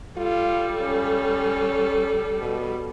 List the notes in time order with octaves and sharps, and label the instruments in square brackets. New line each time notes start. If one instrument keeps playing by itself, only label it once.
[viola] G3 A4 [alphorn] F4
[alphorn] C#4
B2